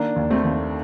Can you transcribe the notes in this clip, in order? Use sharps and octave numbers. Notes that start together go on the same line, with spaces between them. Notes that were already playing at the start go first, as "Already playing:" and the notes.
Already playing: D#3 A#3 D4
D#2
A3 C4
D#2